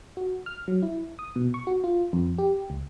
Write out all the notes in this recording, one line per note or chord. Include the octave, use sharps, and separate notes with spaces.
F#4
F6
F#3
E4
D#6
B2
C#6
F#4
F4
F2
G4
C#2